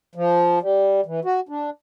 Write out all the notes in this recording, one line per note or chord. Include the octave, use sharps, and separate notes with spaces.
F3
G3
E3
F#4
D4